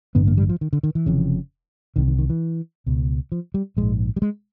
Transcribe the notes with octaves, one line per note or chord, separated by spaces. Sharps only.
A1 G2 D3 B3
A#3
G3
F3
D#3
D3
D#3
E3
F1 F2 C#3
C2 C3 D#3
D#3
D#3
E3
C#2 B2
F3
G3
A#1 G#2 G#3
G3
G#3